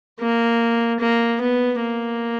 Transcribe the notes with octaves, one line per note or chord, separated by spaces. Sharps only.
A#3
A#3
B3
A#3